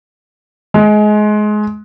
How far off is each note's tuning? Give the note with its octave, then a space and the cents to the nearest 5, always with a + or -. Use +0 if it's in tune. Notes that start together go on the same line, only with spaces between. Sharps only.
G#3 +25